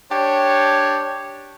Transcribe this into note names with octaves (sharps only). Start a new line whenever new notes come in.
D4 G4 C#5